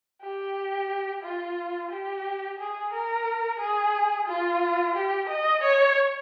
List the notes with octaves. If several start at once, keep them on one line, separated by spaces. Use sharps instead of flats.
G4
F4
G4
G#4
A#4
G#4
F4
G4
D#5
C#5